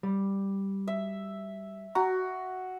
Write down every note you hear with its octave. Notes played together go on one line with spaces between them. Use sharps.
G3
E5
F#4 A#5